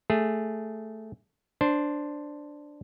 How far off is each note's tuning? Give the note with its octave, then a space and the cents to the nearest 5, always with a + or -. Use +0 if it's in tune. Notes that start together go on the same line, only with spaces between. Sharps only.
A3 +0 G#4 +0
D4 +0 C5 +0